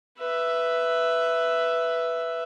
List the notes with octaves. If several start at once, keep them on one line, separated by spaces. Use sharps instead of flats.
B4 E5